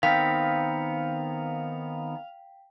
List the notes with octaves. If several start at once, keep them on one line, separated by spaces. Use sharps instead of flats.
D#3 B3 C4 F5 G5 B6